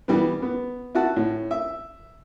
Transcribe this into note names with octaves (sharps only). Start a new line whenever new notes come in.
E3 G3 B3
B3
E4 F#4 F#5 A5
A2
E5